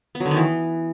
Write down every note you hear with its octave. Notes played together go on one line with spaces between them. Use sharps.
B3
F#3
D3
D#3
E3